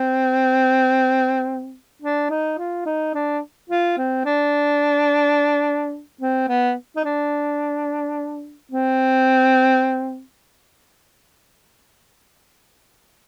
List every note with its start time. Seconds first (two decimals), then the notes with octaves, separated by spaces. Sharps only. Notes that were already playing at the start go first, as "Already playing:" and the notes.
Already playing: C4
2.02 D4
2.30 D#4
2.58 F4
2.86 D#4
3.14 D4
3.70 F4
3.98 C4
4.25 D4
6.21 C4
6.48 B3
6.96 D#4
7.05 D4
8.71 C4